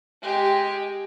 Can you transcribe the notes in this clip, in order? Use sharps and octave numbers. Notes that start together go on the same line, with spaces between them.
G#3 G4